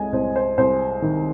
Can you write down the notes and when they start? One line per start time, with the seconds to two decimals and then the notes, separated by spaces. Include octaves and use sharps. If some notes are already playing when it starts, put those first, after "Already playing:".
Already playing: C2 G#3 D#5 G#5
0.12 C2 C5
0.36 C5
0.58 C2 C5
1.02 D#3